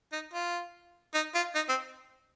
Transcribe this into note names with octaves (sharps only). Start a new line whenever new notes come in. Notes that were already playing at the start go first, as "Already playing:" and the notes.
D#4
F4
D#4
F4
D#4
C4